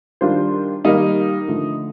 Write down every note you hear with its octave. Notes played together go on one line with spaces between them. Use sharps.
D#3 G3 D4 F4 C5
D#3 G3 A#3 D#4 D#5
D3 F3 A3